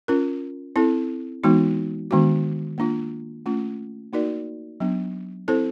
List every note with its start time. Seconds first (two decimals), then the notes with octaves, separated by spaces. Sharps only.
0.08 C#4 F4 A#4
0.76 C4 E4 A4
1.44 E3 G#3 B3 D#4 F#4
2.11 D#3 G#3 B3 D4 F#4
2.78 A#3 D4 F4
3.46 A3 C#4 F4
4.13 A#3 D#4 F#4 A#4 D5
4.80 F#3 B3 D4
5.48 C4 E4 A4 C5